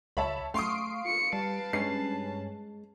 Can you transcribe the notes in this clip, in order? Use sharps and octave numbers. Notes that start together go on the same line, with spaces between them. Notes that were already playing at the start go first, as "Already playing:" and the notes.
C#2 C#5 E5 A5 B5
A3 F5 C6 C#6 D#6 C7 D7
F4 C#7
G3 B4 A5
G2 G#3 C#4 C7